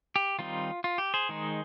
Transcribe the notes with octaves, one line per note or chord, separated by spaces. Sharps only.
G4
D#3 G3 C4 D#4 F4
F4
G4
G#4 C5
D#3 G#3 D#4